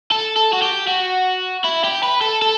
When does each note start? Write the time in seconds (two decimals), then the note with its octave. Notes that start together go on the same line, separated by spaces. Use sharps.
0.11 A4
0.36 A4
0.53 F#4
0.62 G4
0.87 F#4
1.64 E4
1.84 G4
2.03 B4
2.21 A4
2.42 A4